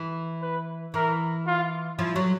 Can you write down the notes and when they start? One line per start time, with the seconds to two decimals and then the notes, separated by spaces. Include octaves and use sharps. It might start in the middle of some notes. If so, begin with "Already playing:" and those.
Already playing: E3
0.42 B4
0.94 E3 A#4
1.47 F4
1.98 F3 E4
2.16 F#3